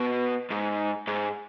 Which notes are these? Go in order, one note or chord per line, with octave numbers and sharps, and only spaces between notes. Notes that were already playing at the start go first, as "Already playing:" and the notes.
Already playing: B2
G#2
G#2